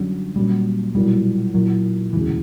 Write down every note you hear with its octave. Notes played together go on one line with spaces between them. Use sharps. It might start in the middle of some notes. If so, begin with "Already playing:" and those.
Already playing: F#2 D3 F#3 G3 C#4
A#2 F#3 G3 A#3 C#4
B1 A#2 F#3 G3 A#3 E4
A#2 F#3 A#3 E4 A#4
E1 D2 C#3 E3